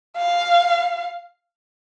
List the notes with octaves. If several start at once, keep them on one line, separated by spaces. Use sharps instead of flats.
F5